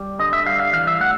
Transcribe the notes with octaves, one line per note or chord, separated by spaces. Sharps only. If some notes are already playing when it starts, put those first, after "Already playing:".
Already playing: G3
D3 D#5
E5
G3 F5
F5
E3 F5
E5
A3 F#5